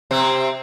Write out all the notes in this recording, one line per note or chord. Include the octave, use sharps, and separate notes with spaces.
C3 C4